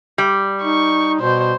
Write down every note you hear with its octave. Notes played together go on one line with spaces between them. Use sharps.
G3
D#4 C#6
B2 C5